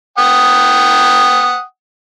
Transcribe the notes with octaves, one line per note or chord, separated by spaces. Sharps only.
F#5 G5 D#6